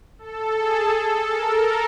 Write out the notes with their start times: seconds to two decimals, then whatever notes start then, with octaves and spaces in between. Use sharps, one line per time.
0.19 A4
0.56 G#4
0.92 A4
1.29 A#4